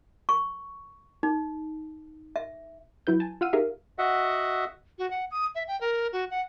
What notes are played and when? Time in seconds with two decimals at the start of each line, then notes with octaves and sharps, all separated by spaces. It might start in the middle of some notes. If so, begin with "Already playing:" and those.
0.29 C#6
1.23 D#4
2.36 E5
3.07 F#3 E4 B4 G6
3.20 G#5 A5
3.41 F4 F5 F#5 E6 F6 D#7
3.53 D#4 G4 G#4 A#4 E5 F5
3.98 F#4 D#5 E5 F#5
4.99 F#4
5.11 F#5
5.31 D#6
5.55 E5
5.68 G5
5.81 A#4
6.13 F#4
6.31 F#5